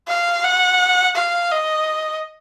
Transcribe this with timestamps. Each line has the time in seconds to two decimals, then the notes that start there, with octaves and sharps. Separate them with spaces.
0.08 F5
0.44 F#5
1.16 F5
1.51 D#5